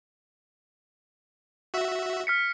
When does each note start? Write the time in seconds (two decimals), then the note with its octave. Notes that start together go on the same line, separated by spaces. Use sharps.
1.74 F#4 E5
2.27 F6 B6 C#7